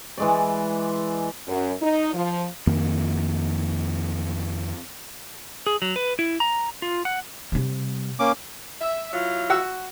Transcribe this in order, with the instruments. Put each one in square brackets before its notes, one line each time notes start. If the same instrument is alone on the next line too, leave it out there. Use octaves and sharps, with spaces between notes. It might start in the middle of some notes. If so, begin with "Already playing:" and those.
[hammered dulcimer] E3 G#3 D5
[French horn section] F#2
D#4
F3
[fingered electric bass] F2 D#3 A#3
[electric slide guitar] G#4
F#3
B4
E4
A#5
F4
F#5
[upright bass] C3 G3
[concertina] A#3 C#4 D6
[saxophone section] E5
F#3 E4 F4
[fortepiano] F#4 F#5 E6